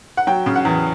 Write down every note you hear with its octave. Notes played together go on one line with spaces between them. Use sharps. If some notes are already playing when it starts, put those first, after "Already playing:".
F#5
F#3 G5
C#3
F#5
E2